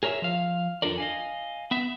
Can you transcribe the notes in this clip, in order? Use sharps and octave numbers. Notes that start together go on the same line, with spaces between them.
G#4 A#4 C#5 D#5 E5
F3 F5
F2 D4 F4 A4 A#4 D5
D#5 F5 G#5
B3 E5